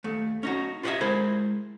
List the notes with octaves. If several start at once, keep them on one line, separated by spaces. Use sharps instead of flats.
D#2 A3
C#4 D#4 F#4
F4 G4 B4 C#5 D#5 E5
G#3 E4 A#4 C5